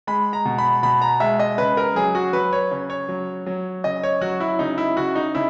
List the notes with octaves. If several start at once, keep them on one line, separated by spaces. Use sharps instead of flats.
G#3 B5
A#5
B2
B5
B2 B5
A#5
G#3 E5
D#5
C#3 B4
A#4
F#3 G#4
F#4
F#3 B4
C#5
C#3
C#5
F#3
F#3
C#3 D#5
C#5
F#3 F#4
E4
C#3 D#4
E4
C#3 F#4
D#4
C#3 E4